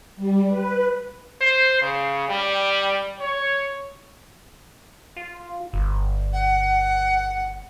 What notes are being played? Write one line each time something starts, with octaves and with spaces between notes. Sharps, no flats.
G3
B4
C5
C#3
G3
C#5
F4
G1
F#5